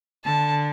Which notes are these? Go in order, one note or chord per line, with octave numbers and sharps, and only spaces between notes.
D3 A5